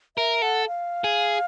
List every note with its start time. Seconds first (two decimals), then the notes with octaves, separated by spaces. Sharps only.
0.17 A#4 E5
0.42 A4 F#5
0.67 F5
1.04 G#4